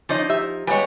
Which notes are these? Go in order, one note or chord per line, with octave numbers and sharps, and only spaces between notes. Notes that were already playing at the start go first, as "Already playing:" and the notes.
F3 C#4 D#4 D5 D#5
G4 E5
G3 G#3 B3 B4 C#5 G#5